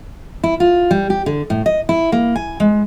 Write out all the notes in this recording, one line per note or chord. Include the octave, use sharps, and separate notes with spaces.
E4
F4
G3
G4
D3
A2
D#5
E4
A#3
G#5
G#3